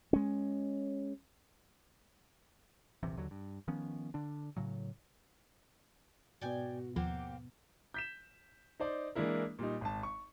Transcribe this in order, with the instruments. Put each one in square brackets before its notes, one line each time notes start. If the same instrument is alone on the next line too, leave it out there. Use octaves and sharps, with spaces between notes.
[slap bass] G#3 C#4
[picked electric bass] D#1 A#1 C3 E3
D#2 D3 F#3
G2
D#3 F3 B3 C#4
D3 D4
A2 C#3 F#3
[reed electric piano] G#2 B2 B3 [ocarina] F#4 [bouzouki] D5 G5 G#5
[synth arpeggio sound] D#2 F3 [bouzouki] A#3 C4 G4 [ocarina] F#5
[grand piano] G6 B6 E7
D#4 C5 D5
E3 G#3 A#3 D4 E4 A#4
A#2 G3 D#4
G#1 A5
C#6